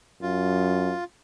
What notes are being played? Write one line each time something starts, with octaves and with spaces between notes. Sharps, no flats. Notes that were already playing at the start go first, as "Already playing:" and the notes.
F#2 F4